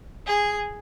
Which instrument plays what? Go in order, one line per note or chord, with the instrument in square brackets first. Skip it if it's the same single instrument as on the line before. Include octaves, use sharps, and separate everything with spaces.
[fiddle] G#4